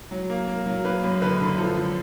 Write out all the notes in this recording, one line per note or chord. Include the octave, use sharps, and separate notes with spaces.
F#3
A#3
A#3
F#3
A#3 B4
F#2
D3 B4
D3
F3 A4
F#2